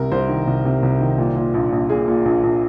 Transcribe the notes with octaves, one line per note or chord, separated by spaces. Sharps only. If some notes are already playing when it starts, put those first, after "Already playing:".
Already playing: C2 C3 A#4
C2 C5
D#3
C2
C3
C2
D#3
A#2
A#2
A#1
A#1
A#2 G#4
A#2
A#1
A#1